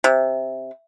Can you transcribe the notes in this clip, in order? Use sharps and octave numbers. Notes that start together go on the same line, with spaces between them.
C3